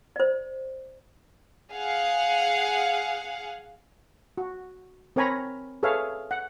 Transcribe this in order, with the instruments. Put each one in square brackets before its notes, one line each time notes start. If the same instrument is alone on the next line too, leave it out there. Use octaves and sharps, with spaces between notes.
[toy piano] C5 D5
[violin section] G#4 F5 F#5
[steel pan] F#4
C4 A#4 C#5 G#5 A#5 B5
G#4 A4 B4 C#5 E5 F5
F#5